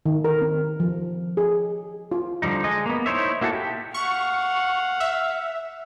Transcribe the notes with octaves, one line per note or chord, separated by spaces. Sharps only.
D#3
A#4
C4
F3
G#4
F4
D3 F3 G3 D#4
G#3 D#5
A#3 B3
D#4 E4 C5 C#5 E5
A#3 E4 F#4 G#4 A4
G4
F5 F#5 C#6
E5